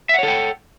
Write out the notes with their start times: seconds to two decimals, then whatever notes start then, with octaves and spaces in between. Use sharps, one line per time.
0.09 E5
0.14 F#5
0.19 C#5
0.23 A4
0.28 G5